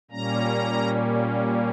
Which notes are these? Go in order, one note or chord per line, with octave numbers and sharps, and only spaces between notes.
A#2 G3 A#3 C#4 A#5